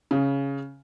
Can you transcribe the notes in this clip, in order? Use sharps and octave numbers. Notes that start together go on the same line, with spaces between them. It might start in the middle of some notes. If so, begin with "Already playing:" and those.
C#3